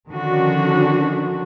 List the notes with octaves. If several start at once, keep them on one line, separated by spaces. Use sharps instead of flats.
D3 D#3 F3 C#4 D4 F#4